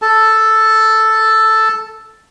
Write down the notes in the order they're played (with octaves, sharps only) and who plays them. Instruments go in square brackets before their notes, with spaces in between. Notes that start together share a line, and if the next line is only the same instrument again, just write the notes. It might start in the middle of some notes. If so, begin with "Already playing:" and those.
[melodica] A4 A5